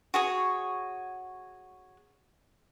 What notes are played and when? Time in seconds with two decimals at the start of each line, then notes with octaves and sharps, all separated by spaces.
0.14 F#4 G#4 C#5